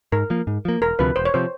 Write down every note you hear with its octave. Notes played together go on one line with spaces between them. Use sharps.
G#2 A#4
F3 A#3
G#2
F3 A#3
E1 A#4
D2 C3 F3 B4
E1 C5
C#5
C3 F3 C5